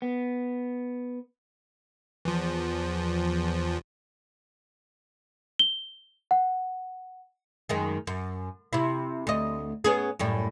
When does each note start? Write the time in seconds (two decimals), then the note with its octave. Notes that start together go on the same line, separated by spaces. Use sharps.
0.02 B3
2.25 E2 F3
5.59 G7
6.31 F#5
7.69 F#2 D#3 G#3
8.07 F#2
8.73 C3 E4
9.27 D2 D#5
9.84 B3 C#4 G#4
10.19 F#2 A2 G3